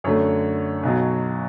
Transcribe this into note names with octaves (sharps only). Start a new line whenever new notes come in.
F#2 D3 A3 C#5
B1 B2 F#3